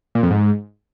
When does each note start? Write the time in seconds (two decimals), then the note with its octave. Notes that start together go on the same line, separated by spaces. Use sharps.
0.15 A#2
0.23 F2
0.31 G#2